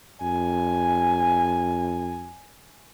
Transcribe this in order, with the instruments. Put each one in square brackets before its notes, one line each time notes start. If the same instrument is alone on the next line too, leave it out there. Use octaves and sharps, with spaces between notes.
[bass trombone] F2 [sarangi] G#5